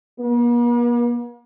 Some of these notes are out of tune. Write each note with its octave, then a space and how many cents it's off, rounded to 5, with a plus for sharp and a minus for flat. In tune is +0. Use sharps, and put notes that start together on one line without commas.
A#3 +45